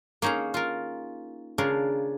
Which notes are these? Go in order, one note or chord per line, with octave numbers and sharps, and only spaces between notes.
A#3 C#4 D#4 G#4 A#5
F4 A#4
C#3 D4 F4 A#4